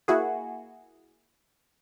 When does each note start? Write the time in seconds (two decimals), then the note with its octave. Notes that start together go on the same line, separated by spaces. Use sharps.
0.08 A#3 E4 F#4 G#4